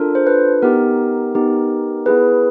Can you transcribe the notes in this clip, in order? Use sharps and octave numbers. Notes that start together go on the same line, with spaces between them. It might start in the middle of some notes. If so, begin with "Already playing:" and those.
Already playing: D4 F4 A4 A#4
C5
B4
B3 D#4 G4 A#4
B3 D#4 G4
B3 E4 G#4 B4